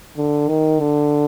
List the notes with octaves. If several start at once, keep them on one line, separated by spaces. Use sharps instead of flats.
D3
D#3
D3